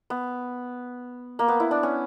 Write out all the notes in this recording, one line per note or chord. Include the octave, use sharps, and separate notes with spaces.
B3
A#3
B3
E4
D4
C#4